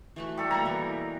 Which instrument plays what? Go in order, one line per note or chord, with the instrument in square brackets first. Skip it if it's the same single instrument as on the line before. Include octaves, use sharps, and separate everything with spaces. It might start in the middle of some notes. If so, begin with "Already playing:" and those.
[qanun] E3 A3 F#4
[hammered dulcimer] G3 A4
[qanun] B2 A#3 B5 [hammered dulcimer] A#5
[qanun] E3 G#4